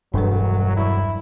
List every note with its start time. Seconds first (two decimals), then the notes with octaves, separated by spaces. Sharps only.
0.14 E1 G2 F#3 D4 A4 B4
0.77 F#3 E4 C#6